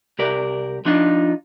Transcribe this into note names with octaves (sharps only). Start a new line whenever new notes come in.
C2 G4 A#4 D5
F3 D4 D#4 F4